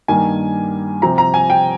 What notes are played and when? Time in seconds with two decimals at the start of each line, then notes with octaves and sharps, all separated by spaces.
0.08 G2 D#3 A#3 G#5
1.02 C3 F3 C4 A#5
1.18 A#5
1.34 G#5
1.50 G5